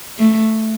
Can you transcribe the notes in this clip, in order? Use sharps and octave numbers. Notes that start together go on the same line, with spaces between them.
A3